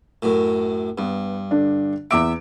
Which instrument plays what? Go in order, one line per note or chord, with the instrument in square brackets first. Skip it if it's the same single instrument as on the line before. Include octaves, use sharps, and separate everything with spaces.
[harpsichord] F#2 A2
[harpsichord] G2 [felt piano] B3
[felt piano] D3 D4
[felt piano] E2 D6 D7 [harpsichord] E5